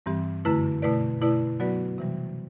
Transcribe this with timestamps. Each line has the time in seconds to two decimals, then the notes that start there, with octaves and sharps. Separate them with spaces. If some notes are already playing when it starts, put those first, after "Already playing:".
0.06 G2 E3 G3 C4 G4
0.45 F#2 D3 A3 E4 B4
0.82 B2 A3 E4 B4 D5
1.21 B2 A3 E4 B4 D5
1.60 F#3 B3 F#4 B4 D5
1.98 C3 E3 G3